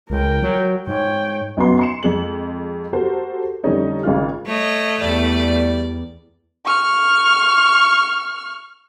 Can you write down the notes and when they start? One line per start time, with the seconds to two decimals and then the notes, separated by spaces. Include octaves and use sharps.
0.10 C#2 A#4 G5
0.43 F#3
0.87 G#2 C#5 G5
1.57 B1 F#2 B3 F#4 C6
1.79 C6 C#7 E7
2.03 F2 G#3 F#7
2.93 F#4 G4 A4 A#4 C5
3.64 F2 D3 G3 A3 C#4 D#4
4.03 G#1 C#3 F4 F6
4.46 A3 C#5 D#5
5.01 E2 G3 D5
6.66 C#6 F6